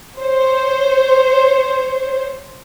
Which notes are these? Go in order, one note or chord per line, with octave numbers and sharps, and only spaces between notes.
C5 C#5